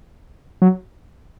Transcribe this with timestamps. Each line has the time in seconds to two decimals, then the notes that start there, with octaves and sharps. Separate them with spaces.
0.62 F#3